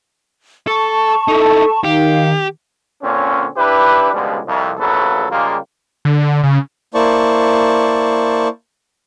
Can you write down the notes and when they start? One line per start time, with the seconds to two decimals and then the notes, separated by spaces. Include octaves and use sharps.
0.67 A4 A5 C#6
1.28 D#4 E4 A4
1.84 D#3 D#4 G4 F5
3.03 A#2 D3 C4 C#4
3.57 D4 E4 G4 B4
4.13 C#2 B2 D3 F3 G3 G#3
4.47 C2 F2
4.79 A#1 E2 C#3 F#3 A4 B4
5.31 C#3 G3 G#3 A#3 F4 G4
6.05 D3
6.44 C#3
6.94 A#3 E4 C5 D5 A5 C#6